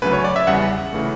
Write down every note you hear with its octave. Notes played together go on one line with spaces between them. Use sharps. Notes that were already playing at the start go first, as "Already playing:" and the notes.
D2 C#3 F#3 B4
C#5
D5
E5
E2 C#3 G3 B3 F#5
C#3 E3 A3